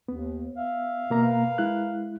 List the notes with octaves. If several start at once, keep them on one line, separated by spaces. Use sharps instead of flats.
D#2 B3
E5 F5
B2 A#3 A#5
A#4 B4 F5
G#3 E4 F#6